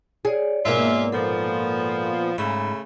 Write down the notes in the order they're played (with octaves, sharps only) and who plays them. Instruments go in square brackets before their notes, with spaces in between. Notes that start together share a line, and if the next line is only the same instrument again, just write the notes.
[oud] G#4 [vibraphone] C#5 D5
[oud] G#2 B2 A#3 [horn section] F4 G#4 E5
[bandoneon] A#2 B3 [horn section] F3 [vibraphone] A4
[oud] G#2 [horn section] C#3 A3 [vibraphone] B5